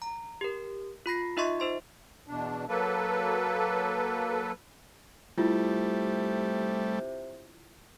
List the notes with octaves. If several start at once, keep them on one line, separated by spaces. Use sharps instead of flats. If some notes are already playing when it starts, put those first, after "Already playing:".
A#5
G4 A#4
F4 B5 A#6 C7
D#4 F4 D#5 E5 C6 C#6
D#4 C5 C6
E2 B2 D4
F#3 A#3 A4 B4
C3 G3 A3 E4 F4